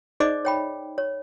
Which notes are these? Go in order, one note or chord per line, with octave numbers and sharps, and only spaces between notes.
D#4 G#4 C5 D5 D#5 D6
C#5 G5 B5
C#5